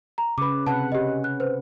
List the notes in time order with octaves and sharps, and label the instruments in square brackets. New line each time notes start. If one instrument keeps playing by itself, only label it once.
[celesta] A#5
[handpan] C#3 B4 [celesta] B5 D6
[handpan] C3 B4 F#5 [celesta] A5
[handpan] C#4 [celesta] G4 D#5
[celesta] F#6
B4 C5